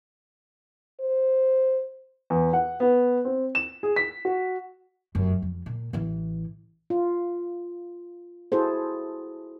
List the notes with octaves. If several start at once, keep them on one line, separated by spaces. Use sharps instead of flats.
C5
E2
F#5
B3
C4
E7
G#4
B6
F#4
F1 F#2
F2
A#2
A1 E3
F4
E4 F#4 G#4 A4 C5